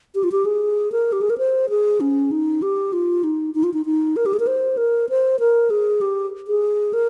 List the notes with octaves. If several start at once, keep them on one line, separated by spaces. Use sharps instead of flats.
G4
F4
G4
G#4
A#4
G4
G#4
A#4
C5
G#4
C#4
D#4
G4
F4
D#4
D#4
F4
D#4
D#4
A#4
G4
G#4
A#4
C5
A#4
C5
A#4
G#4
G4
G#4
A#4